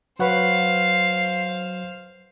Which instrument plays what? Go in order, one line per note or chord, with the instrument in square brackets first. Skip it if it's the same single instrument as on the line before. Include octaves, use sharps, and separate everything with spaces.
[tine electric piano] F#3 [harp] B4 F#5 C#6 [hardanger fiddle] C5 F5